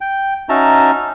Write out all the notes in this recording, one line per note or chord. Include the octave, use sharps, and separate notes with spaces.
G5
C#4 D#4 F#4 E5 A5 A#5